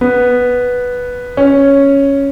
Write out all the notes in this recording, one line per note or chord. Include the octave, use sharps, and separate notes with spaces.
B3
C#4